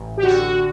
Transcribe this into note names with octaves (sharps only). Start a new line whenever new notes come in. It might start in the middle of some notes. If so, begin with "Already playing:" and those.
Already playing: A1
G4
D3 F#4